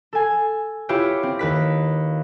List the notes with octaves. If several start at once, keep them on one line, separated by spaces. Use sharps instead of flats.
A4 G#5
E4 F4 G4 B4 C#5
C4
D#2 B4 B6